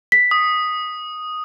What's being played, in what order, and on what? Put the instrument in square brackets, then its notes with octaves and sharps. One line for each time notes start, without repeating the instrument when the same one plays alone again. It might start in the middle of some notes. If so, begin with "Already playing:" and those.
[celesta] B6
[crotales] D#6